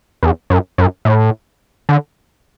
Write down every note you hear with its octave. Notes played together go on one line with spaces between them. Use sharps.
E2
F#2
F#2
A2
D3